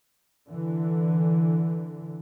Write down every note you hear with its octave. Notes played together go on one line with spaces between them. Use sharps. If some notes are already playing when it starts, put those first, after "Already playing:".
D3 E3